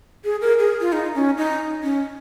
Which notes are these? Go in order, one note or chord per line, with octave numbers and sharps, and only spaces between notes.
G#4
A#4
G#4
F4
D#4
C#4
D#4
C#4